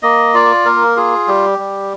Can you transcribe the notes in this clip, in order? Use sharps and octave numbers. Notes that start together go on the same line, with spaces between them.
A#3 D#5
F4 D5
A#3 A#4
F4 G#4
G3 G4
G3